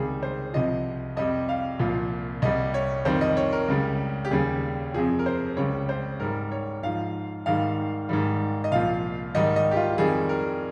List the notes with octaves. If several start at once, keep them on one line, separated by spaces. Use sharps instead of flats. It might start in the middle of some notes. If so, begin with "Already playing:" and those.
Already playing: C#2 C3 D#3 G3 G#4
C5
C2 C3 F3 D#5
F2 C3 G3 D#5
F5
C2 A#2 F3
C2 C3 G3 D#5
C#5
F2 D#3 G3 C5
D#5
C#5
A#4
C#2 C#3 G3
G4
D#2 C#3 G3 G#4
F2 C3 F3 G#4
A#4
C5
C#2 C#3 G3 C#5
C5
G#2 G3 A#4
C#5
G#2 F3 F5
G#2 D#3 G3 F5
G#2 D#3 G3
D#5
C2 A#2 F3 F5
G#2 D#3 G3 D#5
D#5
G4
F4
F2 D#3 G3 G#4
A#4